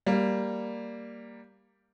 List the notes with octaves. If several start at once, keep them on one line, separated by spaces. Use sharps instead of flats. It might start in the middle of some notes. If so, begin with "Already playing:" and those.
G3 A#3